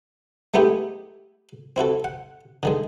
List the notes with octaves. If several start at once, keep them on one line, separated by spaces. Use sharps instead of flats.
G#3 A3 B3 D#4 E4 G4
C4 E4 F#4 A4
F#5
D3 D#3 G#3